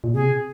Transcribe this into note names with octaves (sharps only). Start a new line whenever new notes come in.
A#2
C3 G#4